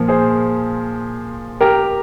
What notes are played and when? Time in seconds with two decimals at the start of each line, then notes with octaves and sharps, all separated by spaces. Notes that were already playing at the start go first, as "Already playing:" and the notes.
Already playing: A#2 F3
0.08 G#4 C5
1.61 G4 A#4